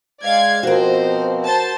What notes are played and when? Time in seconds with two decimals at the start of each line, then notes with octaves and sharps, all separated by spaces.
0.23 G#3 D5 F5 G#6
0.63 B2 F3 C4 F#4 A#4 C5
1.44 C5 A5